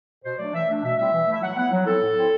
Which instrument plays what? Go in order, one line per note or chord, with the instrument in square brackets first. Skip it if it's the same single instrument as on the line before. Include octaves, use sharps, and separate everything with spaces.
[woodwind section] B2 C5
F#3 A3 D4 D5
E3 E5
A3 D4
B2 E5
G3 C4 E4 E5
E3
A3 E4 E5
F#3 F#5
B3 E4 F#5
F#3
C4 E4 A4
A2
F#3 C4 E4